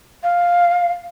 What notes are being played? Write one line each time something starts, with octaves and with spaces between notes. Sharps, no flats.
F5